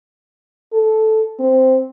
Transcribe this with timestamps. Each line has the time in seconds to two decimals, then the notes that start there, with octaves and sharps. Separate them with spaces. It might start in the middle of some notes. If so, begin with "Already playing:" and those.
0.73 A4
1.40 C4